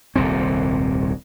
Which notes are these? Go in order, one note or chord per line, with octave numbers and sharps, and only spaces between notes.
D#1 C2 A#2 C4